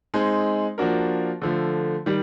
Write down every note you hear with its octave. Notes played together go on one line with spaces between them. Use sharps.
G#3 C4 D#4
F3 A#3 D4 F#4 A#4
D3 F3 A3
D#3 G3